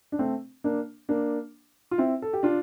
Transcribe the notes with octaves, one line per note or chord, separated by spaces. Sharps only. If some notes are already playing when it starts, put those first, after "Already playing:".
D4
A3 C4
A#3 D4
A#3 D4
F4
C4 E4
A4
G4
D4 F4